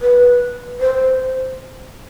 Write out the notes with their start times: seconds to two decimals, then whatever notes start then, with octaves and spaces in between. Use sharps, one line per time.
0.02 B4
0.80 C5